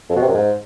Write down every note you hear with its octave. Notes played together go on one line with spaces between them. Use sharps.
F2
B2
C3
F#2
G#2